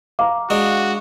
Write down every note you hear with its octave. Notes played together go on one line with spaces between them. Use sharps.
F5 A#5 D6
G#3 D4 F#4 D#5